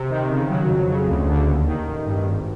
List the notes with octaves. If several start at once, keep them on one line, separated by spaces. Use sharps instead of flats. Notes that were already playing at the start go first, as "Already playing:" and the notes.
Already playing: C3
D#3
C#3
F#3
F2
C#3
D2
D3
D#2
D#3
A1
G2
G#1